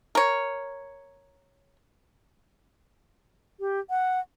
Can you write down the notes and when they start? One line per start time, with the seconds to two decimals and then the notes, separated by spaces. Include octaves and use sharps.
0.15 A#4 C#5
3.60 G4
3.90 F#5